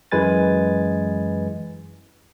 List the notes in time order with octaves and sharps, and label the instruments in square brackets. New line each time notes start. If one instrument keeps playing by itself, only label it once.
[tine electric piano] F#2 E3 G#3 B4 G#5 A6